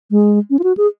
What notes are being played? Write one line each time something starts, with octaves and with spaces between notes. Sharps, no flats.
G#3
C#4
F4
F#4
G#4